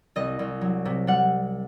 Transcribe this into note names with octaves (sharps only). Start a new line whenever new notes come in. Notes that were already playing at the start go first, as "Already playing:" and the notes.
C2 D#5
C2
F#3
C3
G3 F#5